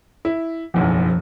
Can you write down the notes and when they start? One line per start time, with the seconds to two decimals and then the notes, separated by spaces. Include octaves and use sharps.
0.25 E4
0.74 F#1 B1 E2 F3